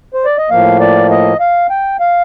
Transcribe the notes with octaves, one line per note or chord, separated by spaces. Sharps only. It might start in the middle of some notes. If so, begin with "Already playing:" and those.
C5
D5
D#5
A2 F3 A#3 F5
D5
D#5
F5
G5
F5